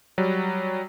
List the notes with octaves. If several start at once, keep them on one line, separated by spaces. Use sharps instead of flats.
F#3 G3